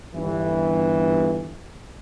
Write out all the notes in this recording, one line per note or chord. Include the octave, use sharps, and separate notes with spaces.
G1 E3